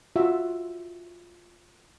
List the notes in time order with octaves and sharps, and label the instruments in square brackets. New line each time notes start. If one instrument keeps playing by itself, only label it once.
[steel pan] F4 F#4 E5